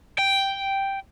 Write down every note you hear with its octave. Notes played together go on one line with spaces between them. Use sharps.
G5